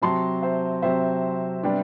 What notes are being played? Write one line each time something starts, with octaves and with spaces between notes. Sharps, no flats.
C3 F#3 C4 A5 C6
C5 E5
C3 F#3 C4 C5 E5
C3 G3 B3 D4